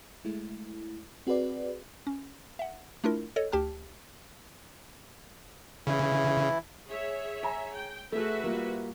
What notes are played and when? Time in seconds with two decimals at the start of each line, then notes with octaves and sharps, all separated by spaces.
0.25 G#3 A3 E4
1.27 C4 F#4 G#4 B4 D5
2.07 C#4
2.59 E5 F#5
3.04 A3 D4 E4 F4 A#4
3.36 A4 C#5 D#5
3.52 D2 G4 G5 A5 F6
5.87 C#3 E3 E4
6.87 G#4 C#5 E5
7.43 G#5 A#5
7.74 G5
8.12 A3 F#4 G#4 B4 E5
8.44 G3 A#3 F4